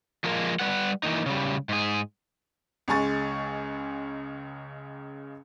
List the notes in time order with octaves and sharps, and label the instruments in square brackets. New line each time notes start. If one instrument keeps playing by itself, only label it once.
[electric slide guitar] F3 G#3 A#3 A#4
G3 B4 F#5
E3 A#3 D#4
C#3 G3
G#2 G#4
[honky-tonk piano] C#2 C#3 G#3 G#5 C#6 A6